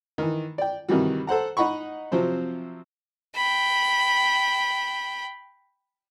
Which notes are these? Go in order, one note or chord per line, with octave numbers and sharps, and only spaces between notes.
D#3 E3
D5 G5
C3 D#3 E3 G3 F#4
A4 C5 F#5 A#5
D#4 D#5 F#5 B5 C#6
C3 F3 F#3 C4 C5
G5 B5